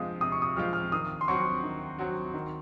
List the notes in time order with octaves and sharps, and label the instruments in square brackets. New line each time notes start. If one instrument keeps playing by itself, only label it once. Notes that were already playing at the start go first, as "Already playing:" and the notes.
Already playing: [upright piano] C3 F3 G#3 C4 F4 [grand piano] D#6
[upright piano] C3 [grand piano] D#6
[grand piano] C#6
D#6
[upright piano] F3 G#3 C4 F4 [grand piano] F6
[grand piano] F6
[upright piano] D#3 [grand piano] D#6
[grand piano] C6
[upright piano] F#3 C4 F#4 [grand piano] C#6
[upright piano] D#3
F#3 C4 F#4
D#3